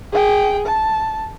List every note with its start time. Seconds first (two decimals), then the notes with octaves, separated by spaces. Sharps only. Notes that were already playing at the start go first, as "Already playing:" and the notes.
0.12 G#4 G5
0.66 A5